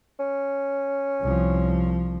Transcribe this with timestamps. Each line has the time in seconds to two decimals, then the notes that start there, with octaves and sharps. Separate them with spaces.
0.19 C#4
1.21 C2 F3